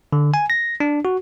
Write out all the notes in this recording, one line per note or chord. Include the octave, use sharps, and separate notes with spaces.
D3
G#5
A#6
D4
F#4